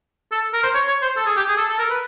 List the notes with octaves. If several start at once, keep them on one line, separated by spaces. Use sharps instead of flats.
A4
A#4
C5
C#5
C#5
C5
A4
G#4
G4
G#4
A4
A4
A#4
B4